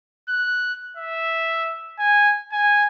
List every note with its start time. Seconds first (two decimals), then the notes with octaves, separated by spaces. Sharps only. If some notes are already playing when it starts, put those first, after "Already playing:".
0.29 F#6
0.97 E5
1.99 G#5
2.52 G#5